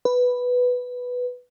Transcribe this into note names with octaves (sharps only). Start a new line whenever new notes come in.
B4